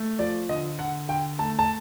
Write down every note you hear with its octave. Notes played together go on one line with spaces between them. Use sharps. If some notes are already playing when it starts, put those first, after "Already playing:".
Already playing: A3
F3 D5
D3 D#5
D3 F#5
D3 G5
A3 A5
A5